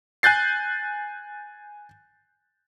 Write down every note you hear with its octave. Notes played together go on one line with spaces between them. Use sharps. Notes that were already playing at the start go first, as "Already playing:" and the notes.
G#5 F#6 G6 A6 C7